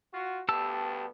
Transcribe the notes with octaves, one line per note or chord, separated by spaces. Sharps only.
F4 F#4
D2 G2 B3 G4 A5 E6